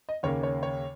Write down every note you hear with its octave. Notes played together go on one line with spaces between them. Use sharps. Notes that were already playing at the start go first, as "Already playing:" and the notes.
D#5
D#2 C#3 A#3 C#4 C#5
C#5
C#5